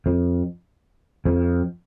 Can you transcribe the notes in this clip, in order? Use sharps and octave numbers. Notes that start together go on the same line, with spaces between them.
F2
F2